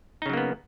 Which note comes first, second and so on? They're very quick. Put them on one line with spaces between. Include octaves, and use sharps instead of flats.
D#4 C#3 F#3 A#3 B3